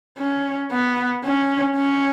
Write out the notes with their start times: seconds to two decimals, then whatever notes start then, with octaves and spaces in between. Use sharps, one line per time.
0.18 C#4
0.71 B3
1.25 C#4
1.76 C#4